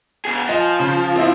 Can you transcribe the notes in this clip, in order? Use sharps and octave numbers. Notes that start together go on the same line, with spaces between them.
B2 G#4
F3 D#5 G#5
C#3
C4 E4